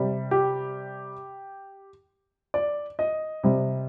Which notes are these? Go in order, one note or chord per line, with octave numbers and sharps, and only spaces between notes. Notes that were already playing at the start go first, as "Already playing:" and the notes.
Already playing: C3 G3
G4
D5
D#5
C3 G3